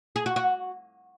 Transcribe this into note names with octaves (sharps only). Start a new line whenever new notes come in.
G#4
F#4
F#4